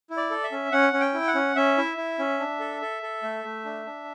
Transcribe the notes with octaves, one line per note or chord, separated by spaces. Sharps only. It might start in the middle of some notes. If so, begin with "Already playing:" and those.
E4
D5
A4
E5
C#4
C#4 F#5
C#4
G5
E4
F#5
C#4
C#4 E5
E4
E4
C#4
D4
A4
A4
A4
A3
A3
D4
D4